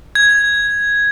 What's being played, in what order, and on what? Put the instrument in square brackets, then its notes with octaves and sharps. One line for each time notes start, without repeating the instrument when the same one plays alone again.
[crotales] G#6